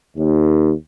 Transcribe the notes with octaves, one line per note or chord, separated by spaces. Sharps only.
D#2